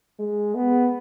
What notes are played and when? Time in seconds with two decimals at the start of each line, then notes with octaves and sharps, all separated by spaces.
0.19 G#3
0.55 B3